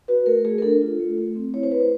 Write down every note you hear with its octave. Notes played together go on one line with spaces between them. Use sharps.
F#4 B4
A3 A#4
A3 G#4
A#4
D4 A4
F4
A3
A3
C4
E4 C#5
C5
A3 B4
C5